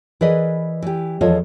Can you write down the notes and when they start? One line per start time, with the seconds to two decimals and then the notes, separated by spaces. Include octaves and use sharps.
0.21 E3 G#4 A#4 B4 D5 D#5
0.82 E3 G4
1.21 E2 F3 F4 A4 C#5 D#5